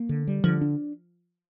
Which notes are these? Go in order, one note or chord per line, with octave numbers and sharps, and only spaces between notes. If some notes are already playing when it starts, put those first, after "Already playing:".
Already playing: A#3
D3
G3
D3 F3
D4